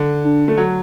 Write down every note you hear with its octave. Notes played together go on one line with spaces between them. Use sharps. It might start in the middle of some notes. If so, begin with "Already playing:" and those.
Already playing: D3
D4
A3
F#3